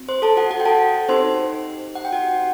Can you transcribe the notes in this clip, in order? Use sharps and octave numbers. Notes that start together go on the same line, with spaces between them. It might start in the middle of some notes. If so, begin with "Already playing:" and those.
Already playing: C4 F#4
C5 C6
A4 A5
F#4 F#5
F#4 F#5
G5
A4 A5
C4 D#4 G4 C5 C6
F#5
G5
F#4 F#5